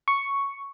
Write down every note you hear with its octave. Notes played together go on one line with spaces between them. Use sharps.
C#6